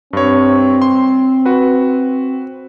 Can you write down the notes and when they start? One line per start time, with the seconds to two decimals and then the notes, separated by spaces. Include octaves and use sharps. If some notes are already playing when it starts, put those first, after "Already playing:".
0.13 G2 C4 C#5
0.82 C6
1.46 F#4 B4